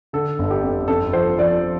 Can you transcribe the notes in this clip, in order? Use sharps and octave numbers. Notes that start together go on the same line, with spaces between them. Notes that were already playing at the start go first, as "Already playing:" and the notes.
D3 A4
G1
G4
F2
F2 A4
F3 C5
F3 D5